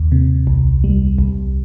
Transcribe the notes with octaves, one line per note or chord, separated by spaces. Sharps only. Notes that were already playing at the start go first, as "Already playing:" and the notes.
Already playing: D#2
C3
C2
G3
C2